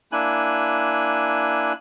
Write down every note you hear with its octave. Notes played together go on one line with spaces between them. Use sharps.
A#3 D4 E4 G#5 F#6